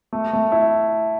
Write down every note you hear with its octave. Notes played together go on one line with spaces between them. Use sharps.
A3
A3
E4